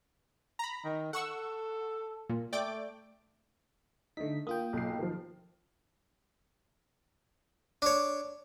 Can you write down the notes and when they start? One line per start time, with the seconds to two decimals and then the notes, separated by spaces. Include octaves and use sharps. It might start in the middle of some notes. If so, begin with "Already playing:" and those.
0.59 A#5 B5
0.85 D#3
1.13 A4 F#5 C#6 E6
2.29 A#2
2.53 A3 D5 G5 D6
4.17 D3 A3 D#4 B6
4.47 A#3 F4 G5 D#6
4.73 B1 C7
4.99 D#3 F3
7.82 D4 C#5